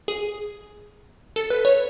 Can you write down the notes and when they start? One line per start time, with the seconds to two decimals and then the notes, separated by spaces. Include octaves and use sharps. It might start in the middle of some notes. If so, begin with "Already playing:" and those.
0.08 G#4
1.36 A4
1.50 B4
1.65 C#5